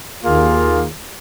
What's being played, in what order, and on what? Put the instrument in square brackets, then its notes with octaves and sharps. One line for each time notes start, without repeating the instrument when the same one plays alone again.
[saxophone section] D#2 D#3 A#3 F4 G#4